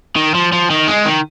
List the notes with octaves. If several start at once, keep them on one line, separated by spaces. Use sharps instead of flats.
D#3
F3
F3
D#3
G#3
D#3